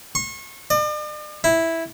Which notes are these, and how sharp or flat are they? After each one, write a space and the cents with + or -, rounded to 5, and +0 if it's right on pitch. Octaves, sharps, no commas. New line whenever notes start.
C#6 -35
D5 +45
E4 -5